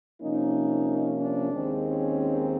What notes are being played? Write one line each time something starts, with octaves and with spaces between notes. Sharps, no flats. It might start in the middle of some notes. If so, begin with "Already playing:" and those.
C3 F3 A#3 C#4 D#4
D4
D#2 D#3 G#3 C4
C#4